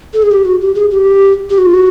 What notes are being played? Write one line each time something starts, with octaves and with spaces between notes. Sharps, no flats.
A4
G#4
G4
F#4
G4
G#4
G4
G4
F#4
F4
F#4